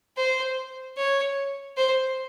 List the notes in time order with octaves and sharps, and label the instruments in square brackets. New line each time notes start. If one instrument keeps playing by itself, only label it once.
[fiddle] C5
C#5
C5